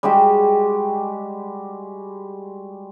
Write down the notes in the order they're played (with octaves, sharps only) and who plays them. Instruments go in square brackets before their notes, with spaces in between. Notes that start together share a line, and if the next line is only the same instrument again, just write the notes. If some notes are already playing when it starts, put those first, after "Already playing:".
[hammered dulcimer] G3 G#3 F#4 G4